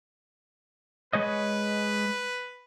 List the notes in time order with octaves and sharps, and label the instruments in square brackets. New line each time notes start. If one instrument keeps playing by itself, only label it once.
[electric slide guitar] G#3 C#5 D#5 [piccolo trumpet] B4